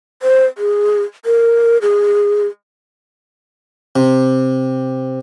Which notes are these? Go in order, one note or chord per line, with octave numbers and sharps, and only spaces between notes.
C5
G#4
A#4
G#4
C3